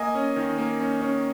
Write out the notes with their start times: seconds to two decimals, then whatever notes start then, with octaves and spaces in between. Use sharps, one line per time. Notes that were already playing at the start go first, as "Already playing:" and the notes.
Already playing: A#3 D#5 G#5
0.15 C#4
0.36 D#3
0.58 A#3
0.80 C#4
1.02 C#4